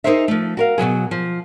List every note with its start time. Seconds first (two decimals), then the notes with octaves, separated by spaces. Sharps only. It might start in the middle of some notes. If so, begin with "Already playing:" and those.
0.04 D#4 E4 G#4 A#4 C5 E5
0.28 F3 A3
0.57 F#4 A#4 F5
0.78 B2 E3 F#3 G#4
1.11 F3